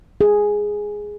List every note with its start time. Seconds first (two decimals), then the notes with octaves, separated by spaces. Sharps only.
0.21 G#4